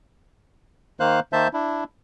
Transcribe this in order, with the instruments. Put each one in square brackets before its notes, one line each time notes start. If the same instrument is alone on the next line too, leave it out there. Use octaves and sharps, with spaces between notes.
[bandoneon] D#3 A#3 C5 F5 F#6
D#3 A#3 C5 E5 A5 G6
D4 E4